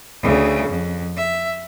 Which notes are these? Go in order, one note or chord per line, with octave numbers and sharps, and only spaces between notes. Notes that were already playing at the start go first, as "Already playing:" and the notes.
D2 C#3
F2
E5